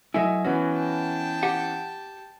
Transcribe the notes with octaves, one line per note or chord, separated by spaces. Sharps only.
F#3 A3 E4 D#5 E5 G#5
E3 B3 C#4 F#4
G5 A5
G4 F#5